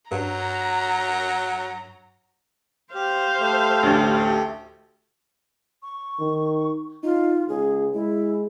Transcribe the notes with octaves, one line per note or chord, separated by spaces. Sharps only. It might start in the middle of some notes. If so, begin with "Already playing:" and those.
G2 F#3 A#5
G4 C5 F5
A3 G4
A1 D2
C#6
D#3
D#4 F4
C#2 G#4
G#3 E4